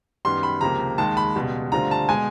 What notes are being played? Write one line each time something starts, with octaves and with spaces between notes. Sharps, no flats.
F#2 D#3 G3 B3 C6
B5
C#2 C3 F3 A#3 A#5
D#2 D#3 G#3 A5
B5
C#2 B2 G3
D2 D3 G3 C4 F4 A#5
A5
B2 G#3 G#5